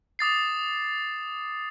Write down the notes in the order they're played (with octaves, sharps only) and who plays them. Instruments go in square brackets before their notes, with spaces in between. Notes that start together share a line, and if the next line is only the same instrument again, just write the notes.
[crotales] D6 D#6 A6 C7